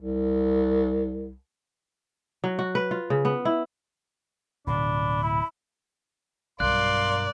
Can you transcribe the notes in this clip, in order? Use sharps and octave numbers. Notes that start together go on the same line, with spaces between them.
C2
F#3
F#4
B4
F4
C#3
B3
E4
D1 B2 D4 B5
E4
B1 G2 A#4 D5 F5 C6 F#6